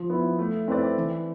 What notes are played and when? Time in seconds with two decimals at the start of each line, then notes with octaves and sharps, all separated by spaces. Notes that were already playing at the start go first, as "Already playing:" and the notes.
Already playing: F3
0.10 B3 E4
0.39 A3
0.68 C4 E4 B4 D5
0.97 E3